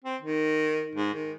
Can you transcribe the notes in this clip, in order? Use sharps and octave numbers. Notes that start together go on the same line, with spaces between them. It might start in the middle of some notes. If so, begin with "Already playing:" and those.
C4
D#3
G#2
D#3